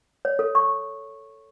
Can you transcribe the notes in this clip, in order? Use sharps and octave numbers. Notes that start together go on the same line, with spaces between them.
C#5
A4
C#6